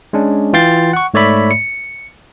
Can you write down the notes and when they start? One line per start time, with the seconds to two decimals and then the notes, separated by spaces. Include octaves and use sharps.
0.13 G#3 C#4 D4
0.53 E3 F4 G5 C6 A6
0.93 F#5 C#6
1.14 G#2 A3 C#5 D5 E5 B5
1.51 C#7